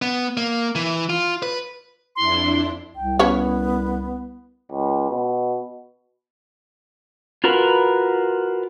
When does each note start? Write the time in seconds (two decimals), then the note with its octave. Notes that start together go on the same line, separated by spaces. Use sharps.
0.02 B3
0.37 A#3
0.75 E3
1.10 F4
1.43 B4
2.16 F2 D4 E4 C6
2.96 C2 G5
3.19 B3 C#4 B4 C#5
4.72 C#2
5.10 B2
7.44 F4 F#4 A#4 B4